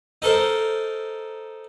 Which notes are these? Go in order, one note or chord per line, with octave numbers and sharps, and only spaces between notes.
D#4 A4 A#4 C5